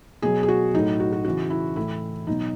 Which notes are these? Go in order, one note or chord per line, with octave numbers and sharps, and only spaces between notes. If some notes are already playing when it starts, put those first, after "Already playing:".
B2 F#3 G#4
G#4
F#4
A2 F#3 D#4
F#4
F#4
C#3 E3 F#4
E4
A2 E3 E4
B2 F#3 D#4